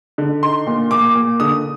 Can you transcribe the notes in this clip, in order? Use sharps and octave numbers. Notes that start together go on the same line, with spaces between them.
D3
D#4 C6
A#2
A#2 D6
A#2
D3 D#6